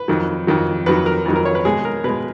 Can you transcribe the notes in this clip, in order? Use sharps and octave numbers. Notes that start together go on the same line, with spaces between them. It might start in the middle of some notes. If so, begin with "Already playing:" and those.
Already playing: B4
F2 D#3 F#3
F2 D#3 F#3
F2 D#3 F#3 B4
A#4
F2 D#3 F#3
A#4
C#5
B4
B2 G#3 G#4
A#4
B2 G#3 B4